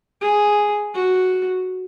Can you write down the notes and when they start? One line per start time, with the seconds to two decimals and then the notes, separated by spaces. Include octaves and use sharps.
0.21 G#4
0.94 F#4